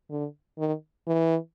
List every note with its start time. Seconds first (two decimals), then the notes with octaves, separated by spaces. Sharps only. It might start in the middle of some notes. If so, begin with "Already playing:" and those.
0.10 D3
0.58 D#3
1.07 E3